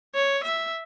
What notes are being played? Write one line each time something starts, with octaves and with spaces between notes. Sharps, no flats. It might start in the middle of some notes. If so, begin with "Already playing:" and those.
C#5
E5